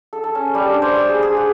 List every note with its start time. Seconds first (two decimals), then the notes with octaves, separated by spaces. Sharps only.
0.13 A4
0.24 A4
0.35 C#4
0.55 G3
0.70 D4
0.82 C5
0.96 E6
1.09 G#4
1.22 G#4
1.37 F#5